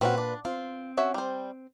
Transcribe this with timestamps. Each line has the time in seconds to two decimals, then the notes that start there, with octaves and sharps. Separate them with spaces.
0.01 A#2 C4 C#4 F#4 B4
0.18 D4
0.45 C4 F4
0.97 C#4 F#4 E5
1.14 G3 C5